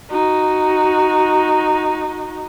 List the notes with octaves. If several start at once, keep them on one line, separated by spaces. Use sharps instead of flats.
D#4 F#4